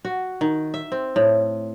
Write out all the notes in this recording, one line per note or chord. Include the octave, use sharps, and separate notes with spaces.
F#4
D#3
E5
C4
A2